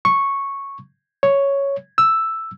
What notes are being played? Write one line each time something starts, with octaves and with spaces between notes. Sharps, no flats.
C#6
C#5
E6